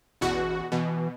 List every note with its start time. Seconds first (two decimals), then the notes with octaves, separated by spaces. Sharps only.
0.21 A1 E2 B2 F#4
0.72 B2 E3